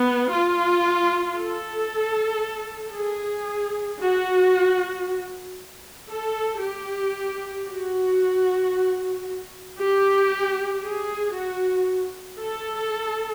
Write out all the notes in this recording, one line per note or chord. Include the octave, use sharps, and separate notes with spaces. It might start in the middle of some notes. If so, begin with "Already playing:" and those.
Already playing: B3
F4
A4
G#4
F#4
A4
G4
F#4
G4
G#4
F#4
A4